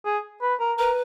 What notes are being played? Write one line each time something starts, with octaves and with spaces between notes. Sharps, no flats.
G#4
B4
A#4
A#4 B4